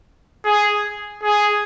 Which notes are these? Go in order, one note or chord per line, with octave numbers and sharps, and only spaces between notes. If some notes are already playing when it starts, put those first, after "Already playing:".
G#4
G#4